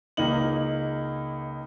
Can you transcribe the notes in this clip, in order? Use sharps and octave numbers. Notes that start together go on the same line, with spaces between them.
C#2 A#3 D#4 F#7